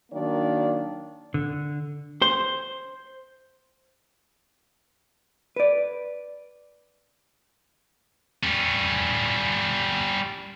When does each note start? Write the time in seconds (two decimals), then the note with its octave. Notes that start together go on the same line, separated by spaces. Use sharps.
0.12 D#3 F#3 A#3 D4 D5
1.34 D3
2.22 C5
5.56 B4 D5
8.43 G3 C#4